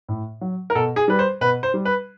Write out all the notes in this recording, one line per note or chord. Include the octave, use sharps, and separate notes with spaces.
A2
F#3
A#4
B2 A4
G#4
G3 B4
C5
B2 B4
C5
G3
B4